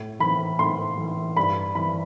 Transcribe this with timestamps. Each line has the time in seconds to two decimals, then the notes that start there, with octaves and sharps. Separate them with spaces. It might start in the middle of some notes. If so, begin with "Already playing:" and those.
Already playing: A2
0.20 E3 B5
0.59 A2 C6
0.98 E3
1.37 G2 B5
1.75 E3 B5